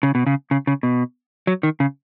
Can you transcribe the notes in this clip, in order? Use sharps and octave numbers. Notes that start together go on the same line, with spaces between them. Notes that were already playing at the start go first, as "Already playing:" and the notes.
C#3
B2
C#3
C#3
C#3
B2
F#3
D#3
C#3